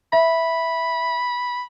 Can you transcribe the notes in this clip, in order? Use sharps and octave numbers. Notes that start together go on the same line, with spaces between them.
E5 B5